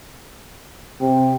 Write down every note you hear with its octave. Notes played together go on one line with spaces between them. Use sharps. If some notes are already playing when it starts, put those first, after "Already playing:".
C3 G5